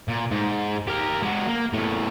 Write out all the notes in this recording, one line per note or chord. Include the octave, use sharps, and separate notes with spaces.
A#2
G#2
G4 A#4
G#3 F#4
A#3
E2 A2